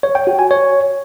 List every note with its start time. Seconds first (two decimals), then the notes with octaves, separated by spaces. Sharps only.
0.03 C#5
0.15 G5
0.27 F#4
0.39 G#5
0.51 C#5